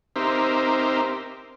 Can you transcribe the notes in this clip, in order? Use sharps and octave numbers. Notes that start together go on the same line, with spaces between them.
C4 D#4 G4 A#4 C5 E5